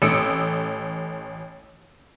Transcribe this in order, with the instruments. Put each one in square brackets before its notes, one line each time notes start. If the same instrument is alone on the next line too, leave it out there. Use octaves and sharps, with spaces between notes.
[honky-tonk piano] A1 A3 D#6 E6 C#7 D7